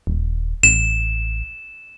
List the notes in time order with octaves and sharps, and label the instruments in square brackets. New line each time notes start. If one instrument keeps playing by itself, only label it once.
[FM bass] D#1
[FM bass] A1 [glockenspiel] E7